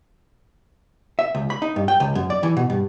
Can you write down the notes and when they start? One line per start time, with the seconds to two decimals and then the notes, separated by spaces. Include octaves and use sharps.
1.19 E5
1.35 C#2
1.50 B5
1.62 D#4
1.76 G2
1.88 G5
2.00 C#2
2.15 F#2
2.30 D5
2.43 E3
2.57 B2
2.70 G2